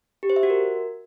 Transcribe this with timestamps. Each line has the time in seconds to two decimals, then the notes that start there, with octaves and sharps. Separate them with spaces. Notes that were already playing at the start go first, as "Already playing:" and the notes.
0.23 G4
0.30 C5
0.36 E5
0.43 F#4
0.50 A#4